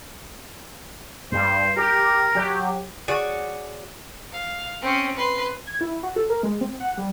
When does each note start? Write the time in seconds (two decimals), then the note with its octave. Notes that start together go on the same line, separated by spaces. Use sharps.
1.32 G2 C5
1.77 G4 A#4
2.35 F#3 G4
3.08 F#4 G#4 C#5 D5
4.32 F5
4.82 C4 C#4
5.16 B4 C6
5.67 G#6
5.81 E4
6.03 F#4
6.16 A4
6.30 A#4
6.43 G#3
6.61 C4
6.80 F#5
6.98 G3